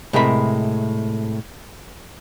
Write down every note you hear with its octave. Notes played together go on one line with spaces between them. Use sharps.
A2 C3 G#3 A#4 B5